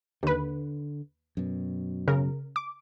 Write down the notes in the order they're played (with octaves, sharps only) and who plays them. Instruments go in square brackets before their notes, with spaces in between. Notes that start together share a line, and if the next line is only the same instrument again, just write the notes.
[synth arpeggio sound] D#2 B4 [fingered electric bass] D3
[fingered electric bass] F#2 B2
[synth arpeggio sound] C#3 A#4
D6